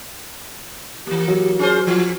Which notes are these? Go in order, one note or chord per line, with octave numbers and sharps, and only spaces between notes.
E3 A#3 G4
F#3 G4
C#4 F4 G#4 C5
F3 F4